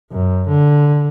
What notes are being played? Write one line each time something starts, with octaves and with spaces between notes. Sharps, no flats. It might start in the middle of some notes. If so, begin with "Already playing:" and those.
F#2
D3